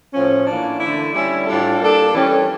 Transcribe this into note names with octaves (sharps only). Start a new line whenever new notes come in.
A2 F3 C#4
E3 A#3 D4
D3 A3 E4
G3 C#4 E4
A2 G3 D4 F4 A4
G3 A#3 D4 A4
E3 G3 C#4